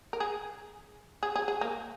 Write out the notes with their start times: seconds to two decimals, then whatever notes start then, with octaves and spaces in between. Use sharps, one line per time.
0.13 A#4
0.20 G#4
1.23 G#4
1.36 G#4
1.48 G#4
1.61 A#3